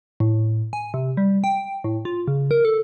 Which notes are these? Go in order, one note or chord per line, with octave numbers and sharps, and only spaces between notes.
A2
G#5
C3
G3
G5
A2
F4
C#3
A#4
A4